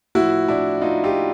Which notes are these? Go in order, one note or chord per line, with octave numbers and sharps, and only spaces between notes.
A2 F3 E4 F#4
D4 E4
D#4 F4
F4 G4